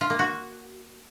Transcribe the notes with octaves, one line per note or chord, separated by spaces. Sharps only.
F4
A#3
F#4